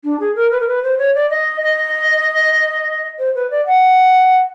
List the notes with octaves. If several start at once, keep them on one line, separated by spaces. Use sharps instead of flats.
D4
G#4
A#4
B4
A#4
B4
C5
C#5
D5
D#5
D#5
C5
B4
D5
F#5